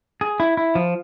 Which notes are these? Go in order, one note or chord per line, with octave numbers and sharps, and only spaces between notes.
G#4
E4
E4
F3